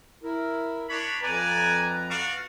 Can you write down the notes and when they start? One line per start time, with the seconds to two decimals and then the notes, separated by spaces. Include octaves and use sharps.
0.23 E4 A#4
0.89 D4 C#5 B5
1.22 F2 B4 D5 G#5 A#5
2.09 F#4 D5 F5